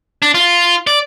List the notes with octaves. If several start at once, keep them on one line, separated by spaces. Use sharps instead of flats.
D4
F4
D5